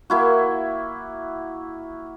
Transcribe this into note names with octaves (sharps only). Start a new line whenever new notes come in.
A#3 E4 F#4